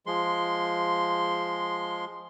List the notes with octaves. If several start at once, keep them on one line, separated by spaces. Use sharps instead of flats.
F3 G#3 C6